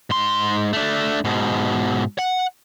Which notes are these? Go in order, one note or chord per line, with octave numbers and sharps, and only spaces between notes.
G#2 C6
A3 D4
G#2 B2
F#5